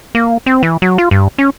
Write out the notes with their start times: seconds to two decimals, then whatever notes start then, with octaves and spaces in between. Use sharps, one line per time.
0.15 A#3
0.46 C4
0.63 E3
0.82 F#3
0.98 F4
1.11 G2
1.38 C#4